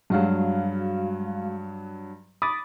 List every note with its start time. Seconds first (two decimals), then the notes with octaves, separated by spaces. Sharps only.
0.10 G2 F#3 G#3 F#4 F5
2.42 B5 D6 D#6 A6